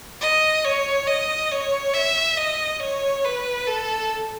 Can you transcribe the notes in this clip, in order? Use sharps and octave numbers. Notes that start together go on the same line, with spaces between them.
D#5
C#5
D#5
C#5
E5
D#5
C#5
B4
A4